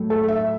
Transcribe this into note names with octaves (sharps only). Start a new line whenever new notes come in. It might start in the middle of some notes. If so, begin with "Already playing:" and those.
Already playing: A2 F#3 A3
A4
E5